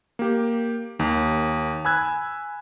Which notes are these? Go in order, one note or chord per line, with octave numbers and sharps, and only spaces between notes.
A#3 G4
D#2 D#4
G#5 B5 E6 F#6 G#6